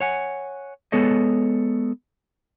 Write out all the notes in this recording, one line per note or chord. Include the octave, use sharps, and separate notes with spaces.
C#5 F#5 G#5
G#3 B3 A4 C#5 D#5